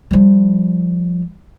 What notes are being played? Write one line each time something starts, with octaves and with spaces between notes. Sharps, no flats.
F3 G3